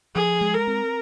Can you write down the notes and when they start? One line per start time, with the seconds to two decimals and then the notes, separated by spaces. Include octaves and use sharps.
0.15 F3 G#4
0.41 G#3
0.54 A#4
0.67 C4